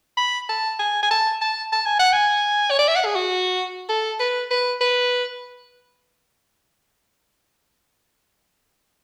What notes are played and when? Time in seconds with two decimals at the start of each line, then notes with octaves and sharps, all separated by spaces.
0.17 B5
0.49 A5
0.79 G#5
1.03 G#5
1.11 A5
1.41 A5
1.72 A5
1.86 G#5
2.00 F#5
2.13 G#5
2.71 C#5
2.79 D5
2.88 E5
2.96 F#5
3.06 G#4
3.16 F#4
3.89 A4
4.20 B4
4.51 B4
4.81 B4